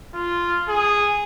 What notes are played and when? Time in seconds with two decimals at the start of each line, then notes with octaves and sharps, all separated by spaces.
0.14 F4
0.68 G#4